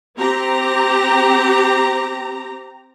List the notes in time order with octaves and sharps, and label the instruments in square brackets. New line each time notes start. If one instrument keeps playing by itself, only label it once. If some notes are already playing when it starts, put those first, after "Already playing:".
[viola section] C4 G4 A#5